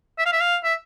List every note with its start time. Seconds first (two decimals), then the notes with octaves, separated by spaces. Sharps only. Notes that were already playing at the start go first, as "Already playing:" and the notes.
0.18 E5
0.26 F5
0.32 E5
0.40 F5
0.64 E5